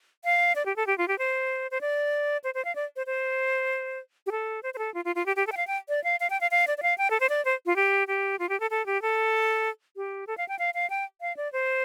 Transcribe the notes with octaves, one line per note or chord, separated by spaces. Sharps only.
F5
D5
G4
A4
G4
F4
G4
C5
C5
D5
C5
C5
F5
D5
C5
C5
G4
A4
C5
C5
A4
F4
F4
F4
G4
G4
A4
G5
F5
G5
D5
F5
F5
G5
F5
F5
D5
D5
F5
G5
A4
C5
D5
C5
F4
G4
G4
F4
G4
A4
A4
G4
A4
G4
A4
F5
G5
F5
F5
G5
F5
D5
C5